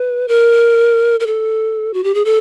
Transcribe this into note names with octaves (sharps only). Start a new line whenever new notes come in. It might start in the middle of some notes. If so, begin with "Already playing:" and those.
Already playing: B4
A#4
A#4
A4
F#4
G4
G#4
A4